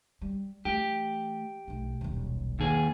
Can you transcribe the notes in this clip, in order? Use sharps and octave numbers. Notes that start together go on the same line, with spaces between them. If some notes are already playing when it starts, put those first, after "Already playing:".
G3
E3 A3 G4
B1 A3
D#1 B1
D#2 G#4